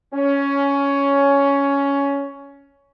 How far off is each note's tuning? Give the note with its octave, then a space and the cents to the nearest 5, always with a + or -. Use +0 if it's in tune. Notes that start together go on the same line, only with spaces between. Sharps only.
C#4 +10